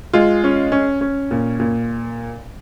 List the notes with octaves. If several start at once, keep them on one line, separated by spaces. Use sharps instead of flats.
G#3 F4
C#4
C#4
C#4
A#2
A#2